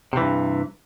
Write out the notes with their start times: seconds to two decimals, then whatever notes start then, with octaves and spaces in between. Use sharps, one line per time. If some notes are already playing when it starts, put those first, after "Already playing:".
0.13 C3
0.17 E3
0.21 G2